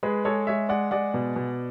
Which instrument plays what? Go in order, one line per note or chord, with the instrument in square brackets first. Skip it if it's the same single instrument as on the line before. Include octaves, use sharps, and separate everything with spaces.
[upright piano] G#3 G#4 B4
G#3 A4 C#5
G#3 C#5 E5
G#3 D5 F#5
G#3 D5 F#5
B2
B2